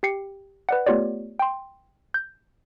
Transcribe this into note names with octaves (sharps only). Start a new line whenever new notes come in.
G4 G5 C7 C#7
B4 D5 F#5
A3 B3 F4 G4 C#5 D5
G5 C6
G6